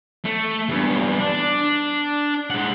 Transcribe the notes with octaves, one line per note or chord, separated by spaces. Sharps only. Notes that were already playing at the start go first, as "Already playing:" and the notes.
A3
E2 G2
D4
G#3 F#5